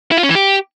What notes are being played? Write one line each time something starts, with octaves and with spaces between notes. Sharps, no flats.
E4
F4
C#4
E3
G4